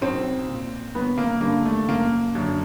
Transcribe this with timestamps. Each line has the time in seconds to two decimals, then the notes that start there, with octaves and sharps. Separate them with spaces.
0.01 B1 C4
0.48 A#2
0.95 G1 B3
1.18 A#3
1.41 G2 D3 A#3
1.65 A3
1.88 F#1 A#3
2.35 F#2 D3